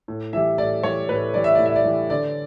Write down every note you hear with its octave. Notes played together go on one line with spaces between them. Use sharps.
A2
E3 G3 E5
A2 D5
E3 G3 C#5
A2 B4
E3 G3 D5
E5
A2 D5
E5
D5
E3 G3
D3 D5